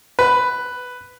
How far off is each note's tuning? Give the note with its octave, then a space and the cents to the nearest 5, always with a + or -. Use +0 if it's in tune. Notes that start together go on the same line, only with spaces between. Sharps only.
B4 +5